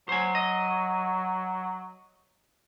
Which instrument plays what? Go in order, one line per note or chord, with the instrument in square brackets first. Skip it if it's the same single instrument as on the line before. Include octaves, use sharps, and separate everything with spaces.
[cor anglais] F#3 [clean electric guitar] C5 G#5
[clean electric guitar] D#5